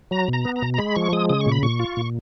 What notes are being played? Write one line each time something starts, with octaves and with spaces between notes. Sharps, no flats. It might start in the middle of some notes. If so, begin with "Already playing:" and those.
F#3 A#5
B2
A#5
B3
A#5
B2
A#5
G#3 B5
F3 C#6
G#3 D#6
C#3 D#6
C#6
A#2
B5
A#2 C#6
F4
A#2